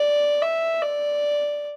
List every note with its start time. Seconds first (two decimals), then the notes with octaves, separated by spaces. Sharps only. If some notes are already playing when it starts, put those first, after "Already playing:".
Already playing: D5
0.42 E5
0.82 D5